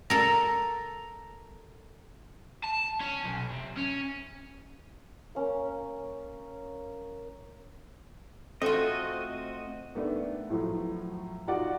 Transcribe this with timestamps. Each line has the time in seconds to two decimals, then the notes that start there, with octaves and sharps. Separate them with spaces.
0.10 A4 A#4
2.64 A5
3.01 C#4
3.24 B1
3.50 C3
3.77 C#4
5.35 A#3 C#4
8.62 A3 C4 F4 F#4 D#5 D#7
9.95 D#3 A3 B3 D4
10.50 A2 F3 F#3
11.47 D#4 F4 F#4 D5 F#5